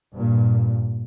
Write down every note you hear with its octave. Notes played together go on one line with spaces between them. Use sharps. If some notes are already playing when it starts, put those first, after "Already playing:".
G2 A#2